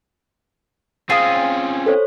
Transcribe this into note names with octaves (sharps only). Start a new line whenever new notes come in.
C4 C#4 F4 G#4 D#6 C7
A4 C5 C#5